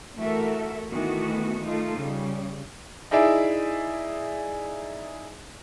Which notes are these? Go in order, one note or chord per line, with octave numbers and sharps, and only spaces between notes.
E3 A3 F#4 A4 A#4 E5
D#3 E3 A3 B3 F#4
A3 D#4 F4 A4
C#3 G3
D#4 E4 G#4 D5 E5